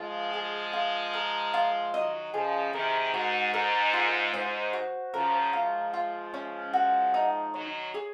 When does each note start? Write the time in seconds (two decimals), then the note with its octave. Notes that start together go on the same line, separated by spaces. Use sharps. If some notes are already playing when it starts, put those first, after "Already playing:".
Already playing: F3 G#3 F4
0.33 G#4
0.73 F4
1.14 A#4
1.54 F4
1.94 D#3 F#3 D#5
2.33 C#3 F3 G#4
2.73 C3 D#3 A#4
3.14 G#2 F#4
3.53 G#2 A#4
3.94 F4
4.34 G#2 C5
4.73 F#4
5.14 C#3 F3 A#4
5.53 F3 G#3 F4
5.94 F4
6.34 C#4
6.73 F#4
7.14 D#4
7.53 D#3 F#3 C#5
7.94 G#4